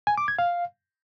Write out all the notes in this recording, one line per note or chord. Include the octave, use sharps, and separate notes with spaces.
G#5
D6
G#6
F5